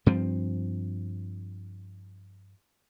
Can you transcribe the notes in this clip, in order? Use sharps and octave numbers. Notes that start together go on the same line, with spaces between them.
G2 F3 C4